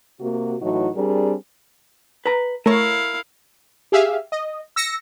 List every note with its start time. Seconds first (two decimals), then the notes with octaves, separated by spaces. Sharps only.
0.21 C3 A#3 F#4
0.61 A2 E3 F#3 D#4 F#4
0.95 G3 C4 D4 G#4 A#4
2.26 B4 A#5
2.66 A3 E4 A#4 C#5 F5
3.92 G4 G#4 E5 F5
4.32 D#5
4.76 E6 A#6 C#7